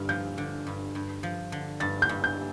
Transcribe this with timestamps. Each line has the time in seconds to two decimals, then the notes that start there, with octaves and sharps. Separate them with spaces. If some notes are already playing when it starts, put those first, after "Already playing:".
Already playing: G2 D3 F6
0.09 F3 G6
0.38 D3
0.67 G2
0.95 G2
1.23 F3
1.52 D3
1.80 G2 A6
2.02 G6
2.09 G2
2.24 G6